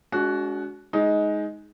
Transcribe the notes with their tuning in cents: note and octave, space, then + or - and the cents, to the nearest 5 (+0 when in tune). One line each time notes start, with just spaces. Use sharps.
G#3 +15 D4 -45 F#4 +0
G#3 +15 D#4 +10